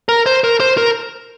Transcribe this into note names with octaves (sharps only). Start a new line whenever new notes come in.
A#4
C5
A#4
C5
A#4